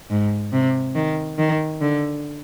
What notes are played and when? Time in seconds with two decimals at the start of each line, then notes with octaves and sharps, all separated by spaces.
0.10 G#2
0.53 C3
0.95 D#3
1.38 D#3
1.81 D3